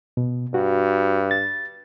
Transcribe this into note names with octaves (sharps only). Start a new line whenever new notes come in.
B2
G2 F#4
A6